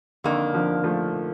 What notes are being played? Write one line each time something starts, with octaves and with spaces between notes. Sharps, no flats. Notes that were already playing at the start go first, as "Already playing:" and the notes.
F2 D3 D#3 A#3
D3 F3
F3 A3